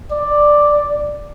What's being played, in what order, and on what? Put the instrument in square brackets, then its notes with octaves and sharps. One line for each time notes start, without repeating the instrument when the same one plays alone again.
[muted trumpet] D5